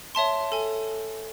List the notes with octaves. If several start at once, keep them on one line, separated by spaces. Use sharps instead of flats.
C#5 E5 A5 C6
A4 G#5